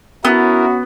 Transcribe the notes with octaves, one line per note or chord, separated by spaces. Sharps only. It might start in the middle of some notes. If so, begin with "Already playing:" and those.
B3 C#4 E4 F#4 A#4